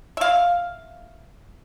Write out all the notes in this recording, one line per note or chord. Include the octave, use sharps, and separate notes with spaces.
E5 F5